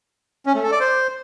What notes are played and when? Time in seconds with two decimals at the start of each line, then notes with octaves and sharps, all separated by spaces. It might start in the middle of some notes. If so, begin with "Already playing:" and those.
0.46 C#4
0.55 A3
0.63 A4
0.72 D5
0.80 C5